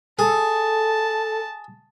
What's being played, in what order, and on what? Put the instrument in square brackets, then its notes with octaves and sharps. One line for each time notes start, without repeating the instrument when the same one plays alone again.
[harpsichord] G#4 [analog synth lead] A4 [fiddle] A5